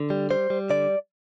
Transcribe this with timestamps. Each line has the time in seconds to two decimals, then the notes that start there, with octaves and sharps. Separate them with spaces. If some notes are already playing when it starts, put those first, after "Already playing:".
Already playing: D3
0.10 G3
0.30 G3 C5
0.50 G3
0.70 D3 D5